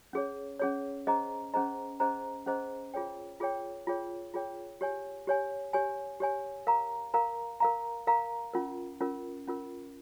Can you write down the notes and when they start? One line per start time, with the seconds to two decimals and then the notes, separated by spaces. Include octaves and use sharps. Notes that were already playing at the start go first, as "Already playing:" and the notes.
0.13 C#4 G#4 C#5
0.59 C#4 G#4 C#5
1.07 C#4 G#4 C5 D#5 A#5
1.54 C#4 G#4 C5 D#5 A#5
2.00 C#4 G#4 C5 D#5 A#5
2.46 C#4 G#4 C5 D#5 A#5
2.94 F4 G#4 C#5 G5
3.40 F4 G#4 C#5 G5
3.87 F4 G#4 C#5 G5
4.34 F4 G#4 C#5 G5
4.81 G4 C#5 G#5
5.27 G4 C#5 G#5
5.73 G4 C#5 G#5
6.20 G4 C#5 G#5
6.67 A#4 F5 A#5
7.14 A#4 F5 A#5
7.60 A#4 F5 A#5
8.07 A#4 F5 A#5
8.53 C#4 F4 A#4
9.01 C#4 F4 A#4
9.48 C#4 F4 A#4